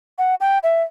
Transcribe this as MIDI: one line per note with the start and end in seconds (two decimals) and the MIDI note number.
0.18 0.35 78
0.41 0.59 79
0.63 0.82 76